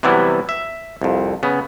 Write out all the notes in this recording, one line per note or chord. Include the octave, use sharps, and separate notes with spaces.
C3 E3 F#3 G3 B3 E4
E5
C2 F2
C#3 B3